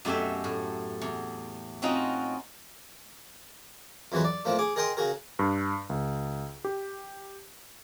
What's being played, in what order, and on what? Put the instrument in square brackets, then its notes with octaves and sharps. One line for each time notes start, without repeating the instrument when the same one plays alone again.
[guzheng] F#2 B2 A3 G4 E5 G#5
A2
E2
C4 C#4 D#4 F4 F#4 D#5
[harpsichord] F2 E3 F#3 G#3 F#4 B4
D5
A2 F3 A#3 C4 D4
G#4 D6
G#4 A#4 D#5 G5 C6 D#6
C#3 F#4 G#4 A#4
[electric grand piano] G2
C#2
G4